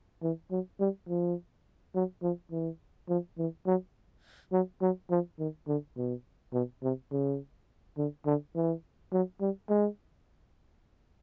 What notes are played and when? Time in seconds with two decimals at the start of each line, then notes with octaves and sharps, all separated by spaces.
0.23 E3
0.51 F#3
0.80 G3
1.08 F3
1.95 F#3
2.22 F3
2.52 E3
3.09 F3
3.38 E3
3.66 F#3
4.52 F#3
4.81 F#3
5.11 F3
5.39 D#3
5.68 D3
5.97 B2
6.53 B2
6.83 C3
7.12 C#3
7.98 D3
8.26 D3
8.55 E3
9.13 F#3
9.41 G3
9.69 G#3